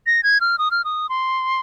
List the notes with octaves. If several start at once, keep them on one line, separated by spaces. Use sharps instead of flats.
A#6
G#6
F6
D#6
F6
D#6
C6